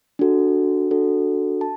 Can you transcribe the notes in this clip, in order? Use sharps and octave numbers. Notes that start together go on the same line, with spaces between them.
D4 F#4 A4
D4 F#4 A4
A5